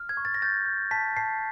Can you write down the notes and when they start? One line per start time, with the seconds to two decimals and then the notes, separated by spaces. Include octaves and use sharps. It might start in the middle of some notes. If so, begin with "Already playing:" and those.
Already playing: F6
0.09 G#6
0.17 C#6
0.25 A6
0.34 A#6
0.42 G6 A6
0.66 G6
0.91 A5 B6
1.16 A5 C7